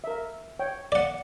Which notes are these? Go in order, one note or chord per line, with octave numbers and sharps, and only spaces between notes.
A#4 E5
C#5 G5
D5 F#5